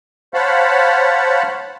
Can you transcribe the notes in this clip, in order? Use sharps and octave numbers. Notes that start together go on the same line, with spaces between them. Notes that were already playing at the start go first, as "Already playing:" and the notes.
C5 C#5 F5 F#5 A5 B5